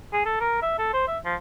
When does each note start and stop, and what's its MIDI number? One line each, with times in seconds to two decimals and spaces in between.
0.13 0.21 68
0.25 0.36 69
0.40 0.57 70
0.62 0.73 76
0.78 0.93 69
0.93 1.06 72
1.08 1.18 76
1.25 1.35 53